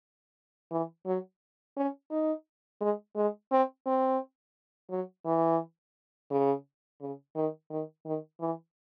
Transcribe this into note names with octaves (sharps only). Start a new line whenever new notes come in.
E3
F#3
C#4
D#4
G#3
G#3
C4
C4
F#3
E3
C#3
C#3
D#3
D#3
D#3
E3